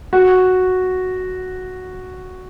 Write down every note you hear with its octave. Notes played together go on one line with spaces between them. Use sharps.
F#4